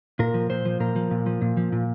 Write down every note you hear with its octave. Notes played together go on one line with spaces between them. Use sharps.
A#2 A#4
F3
A#2 C5
F3
A#2 A#4
F3
A#2
F3
A#2
F3
A#2